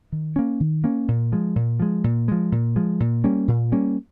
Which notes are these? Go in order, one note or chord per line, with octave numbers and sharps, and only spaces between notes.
D#3
A#3 C#4
D#3
A#3 C#4
A#2
F3 G#3
A#2
F3 G#3
A#2
F3 G#3
A#2
F3 G#3
A#2
G3 A#3 C#4
A#2
G3 A#3 C#4